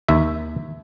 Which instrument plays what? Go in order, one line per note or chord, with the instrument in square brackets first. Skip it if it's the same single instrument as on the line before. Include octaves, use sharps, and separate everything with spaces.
[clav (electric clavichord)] D#2 E5